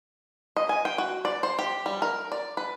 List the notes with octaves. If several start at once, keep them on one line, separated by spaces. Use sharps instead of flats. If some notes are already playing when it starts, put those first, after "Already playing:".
D#5
G#5
G5
F#4
D5
C5
G4
G3
A#4
D5
B4